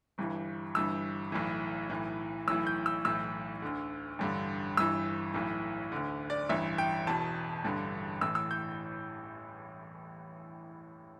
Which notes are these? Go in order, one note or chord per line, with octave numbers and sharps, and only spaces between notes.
G1 G2 E3
G1 G2 E3 E6
B1 A2 E3
B1 A2 E3
B1 A2 E3 E6
G6
E6
B1 A2 E3 E6
D2 D3
A1 G2 D3
G1 G2 E3 E6
B1 A2 E3
D2 D3
D5
A1 G2 E3 E5
G5
E1 E2 B2 A5
A1 G2 D3
A1 A2 E3 E6
E6
G6